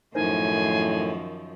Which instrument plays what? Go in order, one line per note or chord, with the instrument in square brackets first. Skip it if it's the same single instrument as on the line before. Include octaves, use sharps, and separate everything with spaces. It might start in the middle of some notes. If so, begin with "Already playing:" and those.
[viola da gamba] F#2 D#3 F3 [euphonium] A2 [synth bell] D#4 A#4 C5 [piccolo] G#5